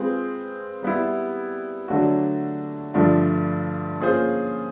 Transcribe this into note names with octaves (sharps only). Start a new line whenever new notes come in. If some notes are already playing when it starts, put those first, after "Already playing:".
Already playing: G#3 C4 F4 G#4 B4
G3 B3 E4
D3 F#3 A3 D4 F#4
G2 D3 F3 A3 D4
A#3 C#4 F4 G#4 C5